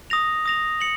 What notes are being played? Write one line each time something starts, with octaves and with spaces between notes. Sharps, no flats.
D#6 A#6 F7
D#6 A#6 F7
C#7 F#7